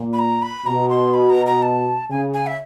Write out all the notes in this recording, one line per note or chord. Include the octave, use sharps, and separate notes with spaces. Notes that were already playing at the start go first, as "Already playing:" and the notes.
Already playing: A#2
B5
A#5
B5
B2 A#5
C6
B5
A#5
A#5
A5
C#3 G#5
G#5
E5